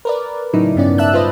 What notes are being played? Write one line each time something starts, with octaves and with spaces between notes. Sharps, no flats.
A#4 B4 D5
A2 C#3 F#3 D#4 E4
G2 B3 C#4 D5
E5 A5 E6 F#6
F4 B4 C5 D#5